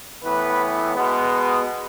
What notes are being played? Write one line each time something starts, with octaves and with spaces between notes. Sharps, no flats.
A2 E3 B3 B4
B2 G#3 B3